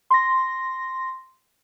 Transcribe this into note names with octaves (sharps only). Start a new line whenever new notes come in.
C6 A#6